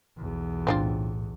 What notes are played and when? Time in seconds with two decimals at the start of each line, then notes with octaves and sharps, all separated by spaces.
0.17 B1 E2
0.67 A2 C4 D4 F4